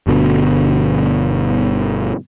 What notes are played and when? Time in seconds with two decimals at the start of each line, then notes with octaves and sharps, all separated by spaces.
0.07 G1 B2 D3